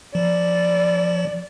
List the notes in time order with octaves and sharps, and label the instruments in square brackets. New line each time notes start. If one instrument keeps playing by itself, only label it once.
[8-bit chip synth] F3 [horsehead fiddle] D5